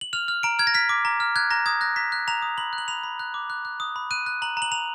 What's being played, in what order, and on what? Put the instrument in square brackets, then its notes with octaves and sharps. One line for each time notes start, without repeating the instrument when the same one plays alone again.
[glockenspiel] F#7
F6 F7
F6
A#5 D7
F6 G#6
A#6
F6 B6
D6
A#5
F6
F#6 G#6
A#5 A#6
D#6 G#6
F#6 A#6
A#5 B6
F#6
A#5 F7
D#6
B5 F#7
F#6
F#7
B5 F7
B5
F#6
D6
F#6
F#6
D#6
B5
F#6 D#7
F#6
A#5 F#7
A#5 F#7
A#5 F7